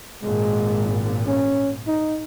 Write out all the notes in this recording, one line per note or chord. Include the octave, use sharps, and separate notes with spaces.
G#1 A#2 G#3
C#4
D#4